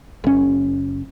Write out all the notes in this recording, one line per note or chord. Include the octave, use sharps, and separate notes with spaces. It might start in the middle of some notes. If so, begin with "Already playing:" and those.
F#1 C#4